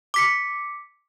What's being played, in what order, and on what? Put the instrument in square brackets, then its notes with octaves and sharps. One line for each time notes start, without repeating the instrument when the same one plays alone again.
[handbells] D6 B6 C#7